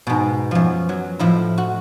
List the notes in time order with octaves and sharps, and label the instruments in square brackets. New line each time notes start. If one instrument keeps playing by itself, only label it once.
[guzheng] G#2 B2
F#2 F3
F#3
A2 F3 E4
F#4